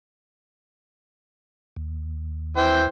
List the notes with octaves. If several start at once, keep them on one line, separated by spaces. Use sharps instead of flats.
D#2
E3 C5 G5